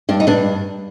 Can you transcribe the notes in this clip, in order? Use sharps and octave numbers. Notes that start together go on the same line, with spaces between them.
G2 D4
D#4
G2 D4